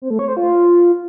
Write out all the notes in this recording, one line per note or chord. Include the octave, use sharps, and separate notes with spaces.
C4
A3
C#5
C5
F4